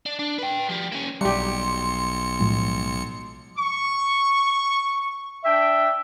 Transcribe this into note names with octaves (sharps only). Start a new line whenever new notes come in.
D4
D4
B4 G5
F3 G3
A#3 C#4
B1 G3 G4 C6 C#7
A2 F3 G#3
C#6
D4 E5 G5